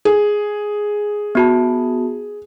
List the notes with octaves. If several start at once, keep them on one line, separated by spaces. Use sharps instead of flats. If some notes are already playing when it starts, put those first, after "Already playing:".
G#4
B3 F#4 A5